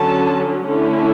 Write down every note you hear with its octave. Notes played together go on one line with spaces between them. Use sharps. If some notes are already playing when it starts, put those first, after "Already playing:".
Already playing: D3 F#3 C#4 A5
D3 A3 C#4 E4